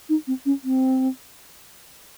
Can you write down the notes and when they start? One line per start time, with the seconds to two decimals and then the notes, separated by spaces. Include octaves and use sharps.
0.09 D#4
0.27 C4
0.46 C#4
0.64 C4